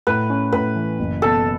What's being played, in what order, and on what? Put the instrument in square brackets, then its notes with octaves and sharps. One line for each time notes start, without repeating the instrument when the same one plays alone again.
[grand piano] A2 [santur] B4
[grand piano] C#4
[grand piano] A2 [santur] B4
[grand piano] E3
F#1
[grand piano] B2 [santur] A4